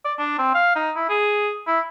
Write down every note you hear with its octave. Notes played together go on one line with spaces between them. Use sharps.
D5
D4
C4
F5
D#4
E4
G#4
E4